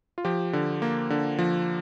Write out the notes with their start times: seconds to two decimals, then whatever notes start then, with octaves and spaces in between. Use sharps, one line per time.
0.18 F4
0.25 F3 G4
0.53 D3
0.82 A#3
1.10 D3
1.39 F3